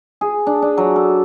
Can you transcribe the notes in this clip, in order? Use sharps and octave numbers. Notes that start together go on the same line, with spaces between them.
G#4
D4
D4
F#3
A4